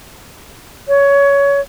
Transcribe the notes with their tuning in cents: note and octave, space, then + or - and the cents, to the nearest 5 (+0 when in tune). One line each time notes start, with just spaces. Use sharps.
C#5 +20